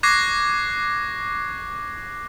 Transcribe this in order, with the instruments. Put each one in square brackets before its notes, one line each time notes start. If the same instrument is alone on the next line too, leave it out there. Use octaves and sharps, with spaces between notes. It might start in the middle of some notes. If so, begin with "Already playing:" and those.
[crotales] C#6 D6 F#6 G#6 A#6 C7